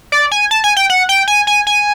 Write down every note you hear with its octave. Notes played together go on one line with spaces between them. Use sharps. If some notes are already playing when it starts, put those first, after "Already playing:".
D5
G#5
A5
G#5
G5
F#5
G5
G#5
G#5
G#5